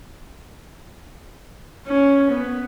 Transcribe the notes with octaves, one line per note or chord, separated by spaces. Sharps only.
C#4
B3